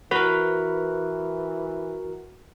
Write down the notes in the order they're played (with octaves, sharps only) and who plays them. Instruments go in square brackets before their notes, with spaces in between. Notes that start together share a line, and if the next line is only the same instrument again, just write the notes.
[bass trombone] E3 [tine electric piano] F#4 A#4 [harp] B4